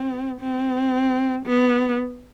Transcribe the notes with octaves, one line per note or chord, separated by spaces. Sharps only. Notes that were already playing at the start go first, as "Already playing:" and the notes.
Already playing: C4
C4
B3